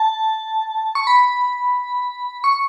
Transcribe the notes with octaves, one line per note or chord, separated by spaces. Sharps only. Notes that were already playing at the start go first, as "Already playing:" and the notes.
Already playing: A5
C#6
B5
C#6